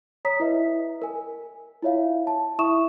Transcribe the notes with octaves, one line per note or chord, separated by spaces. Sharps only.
C#5 A#5 D#6 B6
E4 B4 D#5 E5
A#4 G#5
E4 F4 C#5 E5 F5
A5
E4 E5 C#6 D#6 E7